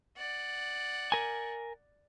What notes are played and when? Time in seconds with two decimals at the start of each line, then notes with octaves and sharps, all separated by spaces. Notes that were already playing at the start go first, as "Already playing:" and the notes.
0.17 D5 F#5
1.12 A#4 G#5